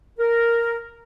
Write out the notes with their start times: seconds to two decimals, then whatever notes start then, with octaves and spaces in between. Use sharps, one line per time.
0.18 A#4